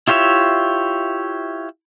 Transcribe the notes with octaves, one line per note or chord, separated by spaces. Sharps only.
E4 F4 G4 C#5 E5